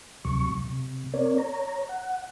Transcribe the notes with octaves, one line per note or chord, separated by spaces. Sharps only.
D2 C3 F#3 C#6
C3
C4 A#4 C#5 D5
C#5 A#5
F#5